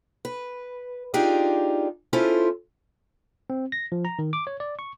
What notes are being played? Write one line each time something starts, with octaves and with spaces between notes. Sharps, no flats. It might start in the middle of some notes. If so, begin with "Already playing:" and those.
B4
D4 D#4 F4 G4 G#4
C#4 E4 F4 G#4 A4 C5
C4
A#6
F3
A#5
D#3
D6
C#5
D5
C#6